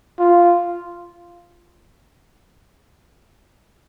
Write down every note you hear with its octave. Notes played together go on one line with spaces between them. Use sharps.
F4